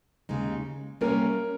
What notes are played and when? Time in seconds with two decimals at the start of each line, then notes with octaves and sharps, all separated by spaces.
0.29 D#2 C#3 G#3 D#4
1.01 C3 G3 A#3 C#4 A#4